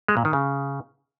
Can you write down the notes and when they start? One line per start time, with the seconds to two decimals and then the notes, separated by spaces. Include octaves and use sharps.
0.08 G#3
0.17 A#2
0.25 D#3
0.33 C#3